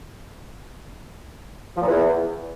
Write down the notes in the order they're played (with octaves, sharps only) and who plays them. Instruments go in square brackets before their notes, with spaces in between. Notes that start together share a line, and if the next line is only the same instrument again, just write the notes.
[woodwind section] F3
A#2
E2